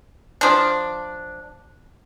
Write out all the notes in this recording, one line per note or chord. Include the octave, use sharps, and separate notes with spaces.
F3 D4